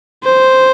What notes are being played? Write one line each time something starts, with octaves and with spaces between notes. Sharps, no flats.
C5